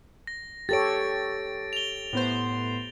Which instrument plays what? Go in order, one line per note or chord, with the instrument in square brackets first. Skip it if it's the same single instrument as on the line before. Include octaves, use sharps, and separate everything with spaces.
[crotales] A#6
[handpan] G4 A4 C#5 [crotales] A6 D7
[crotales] F7 G7
[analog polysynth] A2 B3 C5